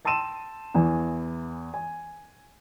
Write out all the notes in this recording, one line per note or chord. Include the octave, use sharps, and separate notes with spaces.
G5 A5 C6 E6 D#7 E7
E2 E3 G#5
G#5